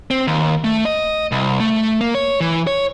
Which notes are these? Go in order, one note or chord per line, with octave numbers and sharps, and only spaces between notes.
C4
D#2
A3
D#5
C2
A3
A#3
C#5
E3
C#5